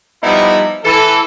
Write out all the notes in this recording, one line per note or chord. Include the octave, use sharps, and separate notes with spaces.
F3 G3 B3 D#4 E4
E3 A4